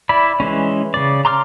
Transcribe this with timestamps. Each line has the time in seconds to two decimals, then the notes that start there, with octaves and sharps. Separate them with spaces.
0.09 E4 D5 B5
0.40 E3 G#3 C#4
0.94 C#3 D5
1.25 A#5 C6 D6 E6 F6